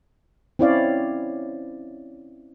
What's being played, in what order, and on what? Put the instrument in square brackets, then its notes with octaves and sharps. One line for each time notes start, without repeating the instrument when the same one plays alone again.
[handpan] C4 C#4 E4 C#5 D5 F5